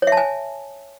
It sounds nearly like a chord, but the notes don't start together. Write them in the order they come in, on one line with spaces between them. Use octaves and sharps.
C#5 E5 A5 G#5